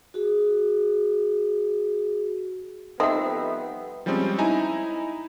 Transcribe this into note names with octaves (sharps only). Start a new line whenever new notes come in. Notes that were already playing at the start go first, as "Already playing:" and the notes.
F#4 G#4
F3 G3 B3 C4 D#4 A4 E5 F#5
F3 G3 G#3 C4 C#4
D#4 E4 G#5 A#5